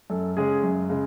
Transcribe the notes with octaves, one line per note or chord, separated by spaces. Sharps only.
F#2 A4
C#3 G#3 C#4 G#4
F#2
C#3 G#3